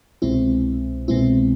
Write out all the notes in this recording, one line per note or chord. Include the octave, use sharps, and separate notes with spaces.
C2 B2 G#3 C4 E4
C2 B2 G#3 C4 E4